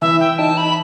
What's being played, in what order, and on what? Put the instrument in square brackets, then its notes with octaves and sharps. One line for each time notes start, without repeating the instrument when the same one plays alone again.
[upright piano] E3 [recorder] E5
[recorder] G5
[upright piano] D#4 [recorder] A5
[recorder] B5